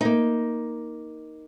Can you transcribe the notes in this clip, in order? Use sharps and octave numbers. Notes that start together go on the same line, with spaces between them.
A#3 D#4